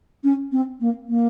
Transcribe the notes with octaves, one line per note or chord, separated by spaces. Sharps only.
C#4
C4
A#3
A#3